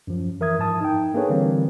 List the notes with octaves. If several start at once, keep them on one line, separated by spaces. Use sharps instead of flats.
F#2 F3
E3 A#4 E5 D#6 G#6
G#2 F3 A5 D#6
D#4 G5
A#3 D4 G#4 A4 B4 C#5
D3 E3 G3 A#3 C4